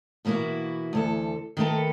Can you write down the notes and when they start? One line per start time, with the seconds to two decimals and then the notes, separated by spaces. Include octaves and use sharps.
0.25 B2 E3 A#3 E4 F#4
0.93 D2 E3 A4
1.57 D#3 A3 A#3 A4 B4